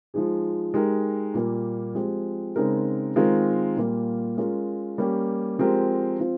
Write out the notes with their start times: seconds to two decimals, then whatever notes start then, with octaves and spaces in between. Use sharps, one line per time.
0.14 F3 G#3 D#4 G#4
0.74 G#3 D#4 G4 A#4
1.34 A#2 G3 A#3
1.95 F3 G#3 C4 G4
2.56 C#3 G#3 C4 D#4 A#4
3.16 D#3 G#3 C4 F4 A#4
3.77 A#2 G3 A#3 F4
4.37 G#3 C#4 F4 A#4
4.98 G3 A#3 C#4 G4
5.59 F3 G#3 C4 G4 A#4
6.20 F3 C4 F4